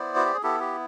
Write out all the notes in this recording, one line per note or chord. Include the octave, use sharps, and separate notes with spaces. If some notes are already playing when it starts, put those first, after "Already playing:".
Already playing: B3 E4 C5 D5
F#4
G4
G#4
B3 E4 G4 A4
G4